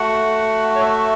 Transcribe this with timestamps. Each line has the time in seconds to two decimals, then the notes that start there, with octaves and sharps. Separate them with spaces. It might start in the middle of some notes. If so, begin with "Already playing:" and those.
Already playing: A3 F#4 F#5
0.75 C#5
0.81 E5